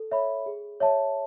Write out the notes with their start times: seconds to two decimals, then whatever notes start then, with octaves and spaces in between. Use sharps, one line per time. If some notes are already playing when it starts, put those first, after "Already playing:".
Already playing: A4
0.11 C#5 E5 B5
0.46 G#4
0.80 C#5 E5 A5